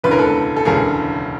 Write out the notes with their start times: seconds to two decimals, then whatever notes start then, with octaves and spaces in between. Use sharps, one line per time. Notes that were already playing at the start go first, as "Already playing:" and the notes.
0.04 E1 D2 C#3 E3 B4
0.11 A#4
0.18 A4 B4
0.56 A4
0.65 E1 D2 C#3 E3 G#4 A#4